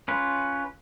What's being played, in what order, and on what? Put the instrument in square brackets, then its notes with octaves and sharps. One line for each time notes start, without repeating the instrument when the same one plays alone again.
[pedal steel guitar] C#4 F4 B4